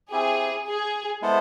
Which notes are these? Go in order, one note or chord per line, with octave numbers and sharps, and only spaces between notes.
C4 E4 G4 G#4
G#4
G#3 B3 E4 A4 C5